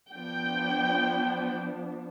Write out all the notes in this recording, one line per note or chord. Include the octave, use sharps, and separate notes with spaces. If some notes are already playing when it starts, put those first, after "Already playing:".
F3 B3 D4 G5